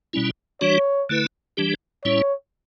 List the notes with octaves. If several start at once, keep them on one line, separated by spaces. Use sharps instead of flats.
B2 G3 C#4 E4
E3 G3 D4 F#4 C#5
D3 A3 E4 B4
E3 G3 D4 G4
A2 G3 C#4 E4 C#5